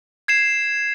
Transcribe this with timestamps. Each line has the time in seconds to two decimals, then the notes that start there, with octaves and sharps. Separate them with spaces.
0.28 G#6 C7 E7